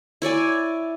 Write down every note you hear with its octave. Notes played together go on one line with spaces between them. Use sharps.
E4 C#5 D5 G#5